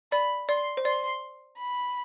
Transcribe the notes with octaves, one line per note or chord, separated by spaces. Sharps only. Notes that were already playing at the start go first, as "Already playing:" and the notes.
D5 B5
D5 C6
C5
D5 C6
B5